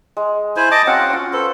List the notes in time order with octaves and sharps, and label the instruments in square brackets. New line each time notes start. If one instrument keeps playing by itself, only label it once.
[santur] G#3
[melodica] E4 C5 G#5
D#5 A5 D6
[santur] F#3 C#4 F5 [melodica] C4 F#5
[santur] C#4 F4
[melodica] A4 [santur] B4 C5 A5